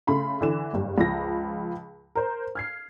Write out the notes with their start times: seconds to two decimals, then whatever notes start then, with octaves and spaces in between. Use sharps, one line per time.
0.07 C#3 A3 B5 C6
0.41 D3 E3 E7
0.73 F#1 G2
0.98 C#2 F3 A#6
2.15 A#4 C5
2.55 F6 G#6 C7